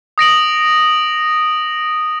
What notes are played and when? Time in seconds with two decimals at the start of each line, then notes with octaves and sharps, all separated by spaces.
0.18 D#6 A#6 D7 F#7